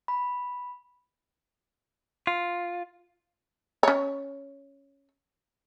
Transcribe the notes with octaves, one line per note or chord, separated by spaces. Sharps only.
B5
F4
C#4 C#5